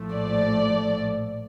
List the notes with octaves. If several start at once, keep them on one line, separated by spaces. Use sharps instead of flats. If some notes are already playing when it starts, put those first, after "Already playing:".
Already playing: A#1 A2 F3 A3
D5